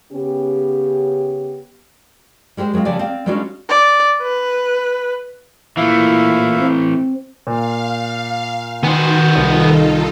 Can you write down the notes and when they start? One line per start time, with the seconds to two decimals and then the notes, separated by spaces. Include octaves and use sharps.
0.13 C#3 B3 C#4 G4
2.57 G3 G#3 G4 B4 C5
2.74 F#3 G#3 A#3 C4 F4
2.85 C#3 F3 A3 G4 D5 G#5
2.99 C4 D5 F5
3.26 G3 G#3 C#4 D4 F4 F#4
3.69 D5
4.22 B4
5.77 A#2 E3 A3 E4 E5 F5
6.60 C4
7.47 A#2 F5
8.83 D#3 B3 F#4 C5 G#5 C6
9.36 C2 D#4 F4 A4